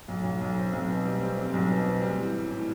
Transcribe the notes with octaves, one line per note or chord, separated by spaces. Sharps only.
B1
B1
B1
C4
B1
B2
G3
C4
G3
B1
B2
C4
G3
E3
A2
A2